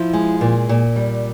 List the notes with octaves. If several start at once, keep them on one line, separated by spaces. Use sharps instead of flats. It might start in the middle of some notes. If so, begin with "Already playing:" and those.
Already playing: F3 E4
G#3
A#2
A#2
G3